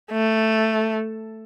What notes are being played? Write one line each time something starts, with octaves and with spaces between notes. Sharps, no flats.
A3